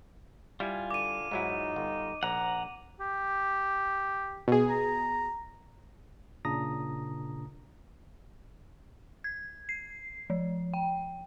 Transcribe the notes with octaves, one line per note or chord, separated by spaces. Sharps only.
G3 E4 F4 G#5
D3 D6 D#7
G#2 F#3 D#4 E4
G1
A#1 F#5 A#5
G4
B2 G#4
A#5
A#2 C#3 D4 A#5 D#6 A#6
G#6
C7
F3
G5